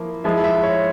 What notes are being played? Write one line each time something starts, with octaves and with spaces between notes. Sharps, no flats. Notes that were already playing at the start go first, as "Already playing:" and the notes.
Already playing: F3 A#3 E4
F3 G#3 E4 E5
E5
C#5